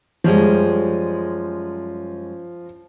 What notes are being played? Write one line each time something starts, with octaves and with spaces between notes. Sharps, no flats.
F#2 F3 G3 G#3